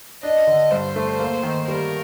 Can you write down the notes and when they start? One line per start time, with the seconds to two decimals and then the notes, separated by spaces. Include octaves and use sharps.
0.23 D4 D#5
0.47 D3
0.71 G2 C5
0.96 A3
1.20 A#3
1.43 D#3
1.68 G3 A#4